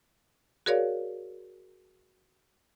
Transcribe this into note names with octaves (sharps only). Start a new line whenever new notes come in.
F#4 G#4 A#4 C#5 D5 F5